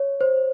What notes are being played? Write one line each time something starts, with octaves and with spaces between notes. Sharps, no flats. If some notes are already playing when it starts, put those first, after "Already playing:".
Already playing: C#5
C5